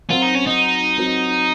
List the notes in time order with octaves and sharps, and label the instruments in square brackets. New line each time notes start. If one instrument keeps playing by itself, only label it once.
[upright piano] F#3 C4 F#4 A#4 [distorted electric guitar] F4
[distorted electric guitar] D#4
C#4
D#4
[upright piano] F#3 C4 F#4 A#4